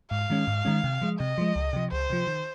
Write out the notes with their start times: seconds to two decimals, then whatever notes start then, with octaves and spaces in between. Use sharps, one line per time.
0.11 G#2 F5
0.30 D#3 G#3 C#4
0.47 G#2
0.65 D#3 G#3 C#4
0.84 C3
1.02 F3 G#3
1.19 C3 D#5
1.38 F3 G#3
1.56 C#2
1.73 C3 F3
1.92 C#2 C5
2.10 C3 F3
2.27 D#3